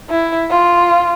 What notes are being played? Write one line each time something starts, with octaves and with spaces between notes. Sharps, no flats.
E4
F4